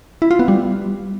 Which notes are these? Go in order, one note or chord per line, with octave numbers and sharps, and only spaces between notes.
E4
F4
B3
G3